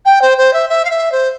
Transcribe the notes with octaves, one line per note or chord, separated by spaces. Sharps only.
G5
C5
C5
E5
E5
F5
E5
C5